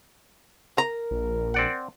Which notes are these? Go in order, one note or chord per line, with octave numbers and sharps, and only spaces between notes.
A#4 A#5
A#1
C4 D5 F#5